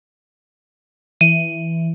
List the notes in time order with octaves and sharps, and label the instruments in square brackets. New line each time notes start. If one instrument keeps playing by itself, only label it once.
[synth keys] E3 [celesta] D#7